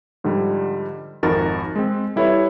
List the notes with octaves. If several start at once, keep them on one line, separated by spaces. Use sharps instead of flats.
G#2 D3 F3 G3
G#1 F2 D#4 F#4 A#4 A6
G#3 C4
G3 E4 A4 B4 C#5 E5